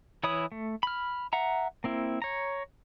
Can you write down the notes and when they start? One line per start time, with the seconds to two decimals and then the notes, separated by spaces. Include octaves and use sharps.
0.24 E3 E4 C#5 B5 D#6
0.52 A3
0.83 B5 F6
1.33 E5 F#5 A#5
1.84 A#3 C4 E4
2.22 C#5 A#5